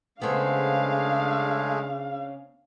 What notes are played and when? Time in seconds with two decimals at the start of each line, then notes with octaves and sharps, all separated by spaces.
0.22 C#3 G#3 A3 B3 C4 D4 G#4 F5